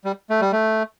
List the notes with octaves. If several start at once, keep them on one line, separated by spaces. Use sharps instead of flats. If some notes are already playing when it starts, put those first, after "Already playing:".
G3
A3
G3
A3